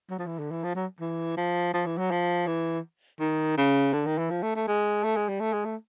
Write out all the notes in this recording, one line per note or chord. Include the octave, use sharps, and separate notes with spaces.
F#3
F3
E3
D3
E3
F3
F#3
E3
F3
F3
E3
F#3
F3
E3
D#3
C#3
D3
D#3
E3
F3
A3
A3
G#3
A3
G#3
G3
A3
G#3
A3